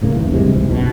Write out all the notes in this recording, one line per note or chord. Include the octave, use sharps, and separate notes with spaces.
D1 A2 C#3 A#3
F#1 D#2 E3
G2 C3 F3 G#3
F#1 C#2 C#3 E3
B1 B2